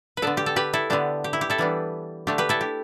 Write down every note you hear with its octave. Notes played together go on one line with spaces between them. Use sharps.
B4
D3 B3 D4 A4 D5
G4
A4
G4 B4
E4 A4
D3 B3 D4 G4
G4
E4
G4
E4 A4
E3 G3 B3 D4
D3 A3 D4 G4
G4 B4
E4 A4
G4